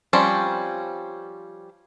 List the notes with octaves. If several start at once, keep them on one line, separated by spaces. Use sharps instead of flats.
F3 G3 C4 C#4